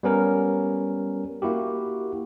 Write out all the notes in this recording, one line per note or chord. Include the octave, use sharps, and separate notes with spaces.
G3 B3 C#4 A#4
A#3 E4 F#4 G4